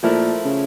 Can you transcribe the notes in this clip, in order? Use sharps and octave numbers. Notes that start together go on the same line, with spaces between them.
A#2 F3 A3 E4 A#4
C#3